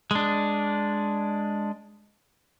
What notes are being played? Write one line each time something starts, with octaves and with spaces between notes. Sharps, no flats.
G#3 D4